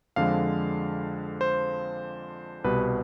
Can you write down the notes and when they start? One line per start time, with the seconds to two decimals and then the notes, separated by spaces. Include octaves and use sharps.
0.16 F2 D3 F3 G#3 F5
1.41 C5
2.64 C2 B2 G3 B4